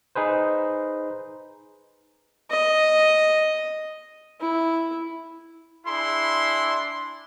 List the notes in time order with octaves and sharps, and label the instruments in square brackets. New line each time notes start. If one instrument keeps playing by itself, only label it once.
[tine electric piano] D#4 G#4 B4 C5
[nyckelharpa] D#5
E4
[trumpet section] D4 E4 G#4 B5 C6